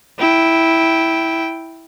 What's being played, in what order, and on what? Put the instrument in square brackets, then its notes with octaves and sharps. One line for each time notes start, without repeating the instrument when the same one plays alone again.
[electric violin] E4 G5